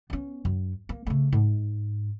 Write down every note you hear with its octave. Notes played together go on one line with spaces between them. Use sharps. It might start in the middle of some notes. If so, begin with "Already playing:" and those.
B3 C#4
F#2
A#3
C#3 A3
G#2